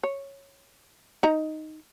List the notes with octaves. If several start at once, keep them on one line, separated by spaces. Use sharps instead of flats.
C#5
D#4 A#5